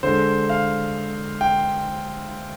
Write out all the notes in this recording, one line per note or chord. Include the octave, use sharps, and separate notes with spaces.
D3 G#3 C5
F5
G5